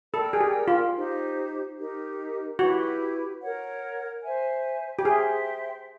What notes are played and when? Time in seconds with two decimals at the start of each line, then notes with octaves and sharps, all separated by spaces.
0.13 A4 A#4 D5 G5
0.33 G#4
0.41 G4
0.68 F4
0.95 D#4 G4 C5
1.77 D#4 G4 A#4
2.59 E4 F#4 G4 B4
3.41 A#4 C#5 F#5
4.23 C5 E5 G#5
4.99 G4
5.05 G#4 C5 E5 G5 C6